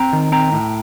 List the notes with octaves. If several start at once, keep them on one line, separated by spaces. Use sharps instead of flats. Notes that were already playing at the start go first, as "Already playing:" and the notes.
Already playing: C4 G5 A#5
D#3
C4 G5 A#5
A2